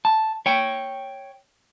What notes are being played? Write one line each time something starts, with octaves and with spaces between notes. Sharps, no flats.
A5
C#5 G5